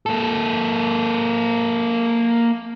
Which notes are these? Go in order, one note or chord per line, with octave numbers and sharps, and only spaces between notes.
A#3 A4